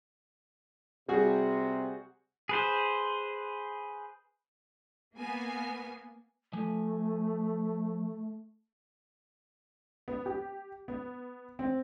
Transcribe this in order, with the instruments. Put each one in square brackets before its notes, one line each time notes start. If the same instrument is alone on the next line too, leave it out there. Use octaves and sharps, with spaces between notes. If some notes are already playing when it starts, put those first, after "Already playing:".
[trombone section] C3 [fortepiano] G3 F#4 G#4
[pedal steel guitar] G#4 B4 C5
[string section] A#3 B3 G#5
[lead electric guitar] F3 G#5 [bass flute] A3
[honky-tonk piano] B3
G4
B3
C4